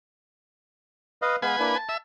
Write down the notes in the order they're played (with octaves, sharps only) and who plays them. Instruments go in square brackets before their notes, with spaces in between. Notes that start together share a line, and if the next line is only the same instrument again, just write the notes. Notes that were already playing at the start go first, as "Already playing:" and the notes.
[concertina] B4 D#5 F5
[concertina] G#3 B3 F5 [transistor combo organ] B4 G#5
[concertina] A#3 D4 E4
A5
[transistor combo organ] E5